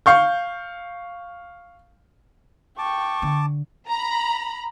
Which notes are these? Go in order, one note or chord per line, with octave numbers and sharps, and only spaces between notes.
F5 C#6 G6
G5 A5 C#6 D6
D3
A#5 B5